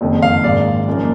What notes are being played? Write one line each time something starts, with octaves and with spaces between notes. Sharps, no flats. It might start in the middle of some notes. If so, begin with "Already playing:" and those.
F#1 F2 D#3 G#3
F5
A#1 G#2 D#3 A#3 D5
F#1 F#2 F3 A#3